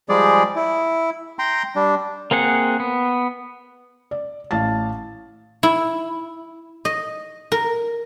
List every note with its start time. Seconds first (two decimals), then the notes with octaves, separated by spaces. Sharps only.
0.09 F3 G3 G#3 G#4 D5
0.56 E4
1.39 G5 A#5 C6
1.76 G3 D4
2.31 A#3 C4 G#4 F#5
2.80 B3
4.11 D5
4.51 A1 F5 A5 A6
5.63 E4
6.85 D#5
7.52 A#4